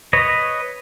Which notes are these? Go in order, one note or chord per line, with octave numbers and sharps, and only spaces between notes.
B4 C#5 D#5